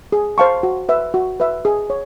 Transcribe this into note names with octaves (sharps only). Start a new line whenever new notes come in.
G#4
C5 F5 A5 C#6
F#4
B4 E5
F#4
B4 E5
G#4
C#5